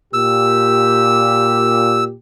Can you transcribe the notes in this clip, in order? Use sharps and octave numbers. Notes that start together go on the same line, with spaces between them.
A#2 G4 E6